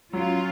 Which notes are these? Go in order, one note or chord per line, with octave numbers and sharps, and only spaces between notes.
F#3 C#4 F4